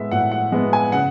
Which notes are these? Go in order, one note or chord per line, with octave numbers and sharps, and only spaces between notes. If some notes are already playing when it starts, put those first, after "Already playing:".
Already playing: A2 G#3 B3 E5
A2 F#5
F#5
G#3 B3
G#5
C#3 F#5